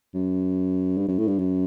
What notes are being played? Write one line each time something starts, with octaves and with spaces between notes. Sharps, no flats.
F#2
G2
F#2
A2
G2
F#2